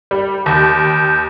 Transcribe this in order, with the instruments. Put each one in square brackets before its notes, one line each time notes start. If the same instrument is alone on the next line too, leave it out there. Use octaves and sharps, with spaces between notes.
[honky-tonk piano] G3
[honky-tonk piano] D#2 [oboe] G5